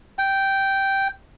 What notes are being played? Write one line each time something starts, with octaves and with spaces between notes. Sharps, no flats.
G5